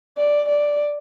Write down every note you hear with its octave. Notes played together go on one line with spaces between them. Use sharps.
D5
D5